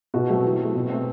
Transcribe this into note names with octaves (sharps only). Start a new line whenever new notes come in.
B2 F#4
F#3 A3 C4
E3
C4
A3
B2
A3 C4